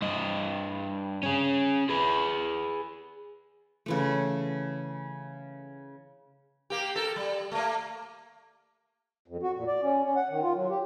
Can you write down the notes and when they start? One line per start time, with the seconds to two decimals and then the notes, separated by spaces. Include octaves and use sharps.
0.02 G2 D#5
1.23 C#4 G#4
1.89 G#4 B4
3.86 C#3 E3 A3
6.70 A#3 G4
6.96 A4 A#4
7.16 G3
7.52 A3 A#3
9.28 F2
9.43 F#4
9.56 A#2
9.67 D5
9.82 C#4
10.04 C#4
10.16 F#5
10.30 D#3
10.43 F4
10.55 F#3
10.70 G4